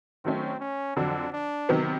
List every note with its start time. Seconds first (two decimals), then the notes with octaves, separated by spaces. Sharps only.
0.25 D#3 F#3 A3 C4 C#4
0.60 C#4
0.96 F2 D3 F#3 D4
1.32 D4
1.69 C3 D#3 F#3 B3